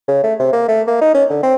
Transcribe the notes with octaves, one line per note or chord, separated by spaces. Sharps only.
C#3
A3
C3
A#3
A3
A#3
D#4
C#4
D3
C4